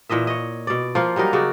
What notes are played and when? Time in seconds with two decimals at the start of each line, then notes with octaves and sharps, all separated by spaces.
0.09 A#2 E3 D#5 E5
0.27 C#5 D#5
0.67 B2 D5
0.95 F3 A#3 F4
1.16 F#3 G3 D#4 A#4
1.33 C#3 F#4 D5